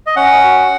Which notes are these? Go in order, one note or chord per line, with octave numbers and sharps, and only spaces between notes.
D#5
C#4 F#5
F#4